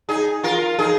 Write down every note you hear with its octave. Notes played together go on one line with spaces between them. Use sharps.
D#4 G#4
F4 A#4
D#4 G#4